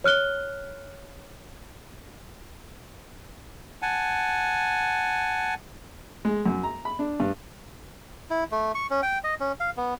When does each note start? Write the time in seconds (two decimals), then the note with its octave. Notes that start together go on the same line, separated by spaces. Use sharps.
0.04 C#5 F6 F#6 G7
3.82 F#5 G#5 A5
6.25 G#3
6.46 F#2
6.63 A#5
6.85 B5
6.99 D4
7.20 G2
8.30 E4
8.52 A3
8.75 C#6
8.90 C#4
9.03 G5
9.24 D#5
9.40 C#4
9.60 F5
9.77 B3